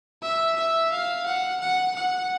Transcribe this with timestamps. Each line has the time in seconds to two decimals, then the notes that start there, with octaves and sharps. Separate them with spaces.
0.22 E5
0.56 E5
0.92 F5
1.26 F#5
1.61 F#5
1.96 F#5